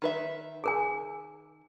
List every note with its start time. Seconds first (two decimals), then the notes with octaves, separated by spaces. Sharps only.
0.02 D#3 B4 E5
0.64 G#4 A#4 G#5